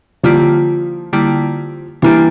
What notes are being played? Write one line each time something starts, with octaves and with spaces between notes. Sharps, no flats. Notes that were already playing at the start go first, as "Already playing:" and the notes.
D3 F3 G3 A#3 E4 G4
D3 G3 A#3 E4 G4
E3 G3 A#3 D4 G4